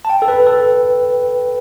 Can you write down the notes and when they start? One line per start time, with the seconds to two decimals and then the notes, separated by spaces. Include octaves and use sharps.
0.05 A5
0.10 G5
0.22 A4
0.28 B4
0.46 A4